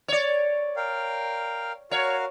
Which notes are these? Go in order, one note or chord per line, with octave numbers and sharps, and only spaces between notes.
C#5 D5
A#4 F5 G5
F#4 A#4 C#5 F5